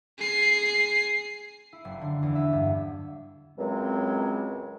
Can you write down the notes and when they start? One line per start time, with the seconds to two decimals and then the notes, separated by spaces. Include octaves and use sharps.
0.18 G#4 C7
1.73 E4
1.85 F#1
2.01 D3
2.23 E2
2.35 E5
2.52 G2
3.57 C#2 F#2 F#3 G#3 C4